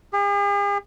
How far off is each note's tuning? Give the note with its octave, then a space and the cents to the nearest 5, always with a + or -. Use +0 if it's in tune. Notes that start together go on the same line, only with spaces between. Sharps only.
G#4 -45